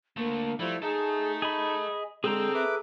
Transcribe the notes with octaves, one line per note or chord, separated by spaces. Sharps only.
D3 A3 A#3
F3 G3 A3 E4
D#4 G#4 A4 E5
G#4 D#5 B5
D3 G#3 C4 G#4 A4 G5 A#5
B4 E5 D6